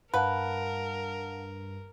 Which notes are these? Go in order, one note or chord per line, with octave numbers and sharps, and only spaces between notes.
G2 A#4 B4 F5 F#5 A5